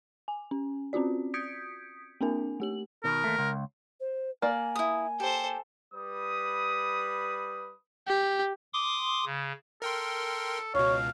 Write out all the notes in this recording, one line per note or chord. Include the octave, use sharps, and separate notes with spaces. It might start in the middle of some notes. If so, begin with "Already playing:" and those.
G#5
C#4
C4 C#4 F4 F#4 D5
D#6 G6 G#6 B6 C#7 D7
A#3 C4 D4 A#4 G#5
A3 G4 F#7
B2 D#3 A#4
D#2 A3
C#2
C5
A#3 D5 G#5
E4 D#6
G4 A4 C5
G3 B4 D#6
G4
C6 D6 D#6
C#3
A4 A#4 G5 C6
C#2 B2 C#5 F5